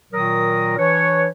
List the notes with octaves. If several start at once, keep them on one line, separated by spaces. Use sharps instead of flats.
A#2 D#3 F#3 A#4 D#6
E3 D4 B4 C#5